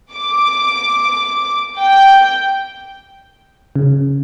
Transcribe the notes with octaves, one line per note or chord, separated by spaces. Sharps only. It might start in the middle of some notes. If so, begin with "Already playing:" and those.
D6
G5
C#3